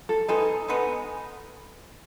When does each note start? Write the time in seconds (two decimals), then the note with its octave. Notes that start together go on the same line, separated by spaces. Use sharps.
0.09 A4
0.28 G#3 B3 D#4 A4
0.68 G#3 B3 D#4